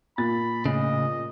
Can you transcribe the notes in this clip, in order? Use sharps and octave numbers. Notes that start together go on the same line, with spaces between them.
A#2 B5 A6
A2 C#3 D#5